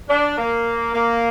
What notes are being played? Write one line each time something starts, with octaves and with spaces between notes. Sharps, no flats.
D4
A#3
A#3